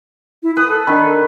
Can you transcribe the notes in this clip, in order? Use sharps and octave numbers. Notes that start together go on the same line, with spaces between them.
E4
B4 D#6
A4
D#3 D4 B5